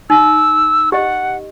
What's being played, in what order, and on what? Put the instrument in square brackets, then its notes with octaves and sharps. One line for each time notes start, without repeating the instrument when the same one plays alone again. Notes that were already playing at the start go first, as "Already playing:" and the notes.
[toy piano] D#4 [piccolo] E6
[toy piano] G4 D#5 [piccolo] F#5